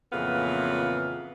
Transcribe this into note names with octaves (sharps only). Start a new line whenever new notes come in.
F2 A#2 C#3 E3 B3 F5